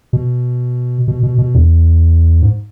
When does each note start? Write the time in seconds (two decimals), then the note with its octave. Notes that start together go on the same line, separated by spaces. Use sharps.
0.13 B2
1.08 B2
1.23 B2
1.38 B2
1.55 E2
2.42 G#2